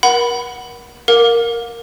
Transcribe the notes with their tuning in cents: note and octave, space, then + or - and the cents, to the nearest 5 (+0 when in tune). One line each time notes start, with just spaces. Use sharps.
A#4 +35 F#5 +0 B5 +0
A#4 +0 F5 +40 D6 +0